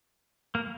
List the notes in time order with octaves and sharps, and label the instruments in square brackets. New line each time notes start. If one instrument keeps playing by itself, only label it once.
[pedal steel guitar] A#3